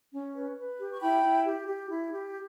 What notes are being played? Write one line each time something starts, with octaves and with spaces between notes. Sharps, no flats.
C#4
B4
B4
G4
C#6
E4 G5 B5
E4
G4
G4
E4
G4